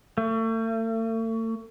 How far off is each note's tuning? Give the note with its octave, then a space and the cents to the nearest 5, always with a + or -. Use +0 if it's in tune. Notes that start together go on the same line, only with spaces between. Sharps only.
A3 +40